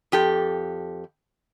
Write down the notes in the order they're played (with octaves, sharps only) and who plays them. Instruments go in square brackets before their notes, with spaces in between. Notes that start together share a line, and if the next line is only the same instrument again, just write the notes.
[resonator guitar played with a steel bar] F2 G4 A4